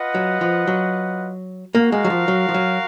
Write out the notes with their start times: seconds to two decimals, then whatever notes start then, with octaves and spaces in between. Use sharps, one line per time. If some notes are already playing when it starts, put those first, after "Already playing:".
Already playing: F4 B4 D#5 F#5
0.15 F#3
0.41 F3
0.68 F#3
1.74 A#3 F#4 A#4 F5
1.92 G#3
2.05 F#3
2.10 F3
2.28 F#3
2.49 F3
2.54 F#3